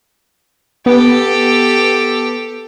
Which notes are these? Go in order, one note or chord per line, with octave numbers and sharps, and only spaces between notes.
B3 G4 A4